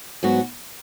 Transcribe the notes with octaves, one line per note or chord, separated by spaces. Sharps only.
G#2 F#3 B3 F#4